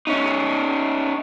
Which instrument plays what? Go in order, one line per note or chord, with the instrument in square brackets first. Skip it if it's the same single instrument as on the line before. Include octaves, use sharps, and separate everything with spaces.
[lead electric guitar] C#4 D#4